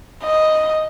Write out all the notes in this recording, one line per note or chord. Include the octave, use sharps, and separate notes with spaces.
D#5